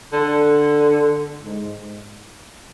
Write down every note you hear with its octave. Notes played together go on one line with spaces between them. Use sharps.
D3
G#2